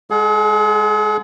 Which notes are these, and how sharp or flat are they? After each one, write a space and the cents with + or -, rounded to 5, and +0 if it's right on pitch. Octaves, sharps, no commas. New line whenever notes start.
G#3 -10 G#4 +45 F#5 -5